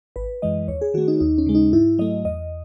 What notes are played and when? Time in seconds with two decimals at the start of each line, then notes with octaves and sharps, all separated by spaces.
0.16 G#1 B4
0.42 F#2 E3 G#3 D#5
0.68 D#2 C#5
0.81 G#4
0.94 D#3 A3 F#4
1.08 D#4
1.20 D#2 D#4
1.38 C#4
1.46 C#3 G#3
1.55 D#4
1.73 G#2 E4
1.99 F#3 A3 D#5
2.25 E2 D#5